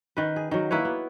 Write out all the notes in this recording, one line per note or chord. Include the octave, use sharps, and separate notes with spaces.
D#3 B4
G#4
D#3 F#3
A#3 E4 B4 C#5
B3